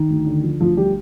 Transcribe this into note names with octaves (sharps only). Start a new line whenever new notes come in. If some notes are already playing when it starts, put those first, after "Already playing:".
Already playing: D#3 D#4
D2
D3
F3
D2 F3 F4
F3 G3 G4